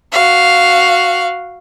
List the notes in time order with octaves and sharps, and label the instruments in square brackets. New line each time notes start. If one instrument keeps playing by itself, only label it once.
[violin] F#4 F5